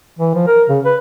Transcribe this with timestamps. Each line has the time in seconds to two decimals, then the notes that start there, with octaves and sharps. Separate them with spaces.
0.19 E3
0.35 F3
0.47 A#4
0.69 C#3
0.85 B4